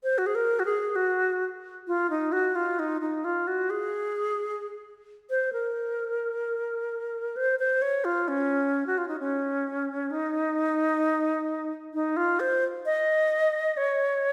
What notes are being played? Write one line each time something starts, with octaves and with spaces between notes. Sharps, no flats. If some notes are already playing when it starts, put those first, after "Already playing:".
C5
F#4
G#4
A#4
F#4
G#4
F#4
F4
D#4
F#4
F4
D#4
D#4
F4
F#4
G#4
C5
A#4
C5
C5
C#5
F4
C#4
F#4
F4
D#4
C#4
D#4
D#4
F4
C5
D#5
C#5